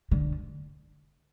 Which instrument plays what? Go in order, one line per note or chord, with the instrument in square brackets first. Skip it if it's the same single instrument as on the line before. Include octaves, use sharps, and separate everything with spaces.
[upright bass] D3